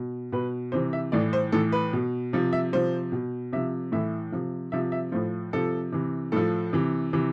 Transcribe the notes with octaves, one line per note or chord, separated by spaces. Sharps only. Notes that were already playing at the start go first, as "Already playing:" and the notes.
Already playing: B2
B2 B4
C3 E3 C5
E5
A2 E3 D5
C5
A2 E3 A4
B4
B2
C3 F3
E5
C3 F3 C5
B2
C3 F3 E5
A2 E3 E5
C3 F3
C3 F3 E5
E5
A2 F3 C5
C3 F3 A4
C3 E3
A2 F3 A4
C3 E3
C3 E3